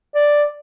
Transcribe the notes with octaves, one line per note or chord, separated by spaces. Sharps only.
D5